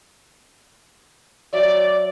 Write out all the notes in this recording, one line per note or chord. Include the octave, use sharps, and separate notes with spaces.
F#3 D5 E5